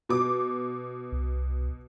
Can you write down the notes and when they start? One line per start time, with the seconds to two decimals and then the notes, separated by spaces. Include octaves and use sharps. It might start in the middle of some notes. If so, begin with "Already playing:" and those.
0.09 B2 D6
1.12 C2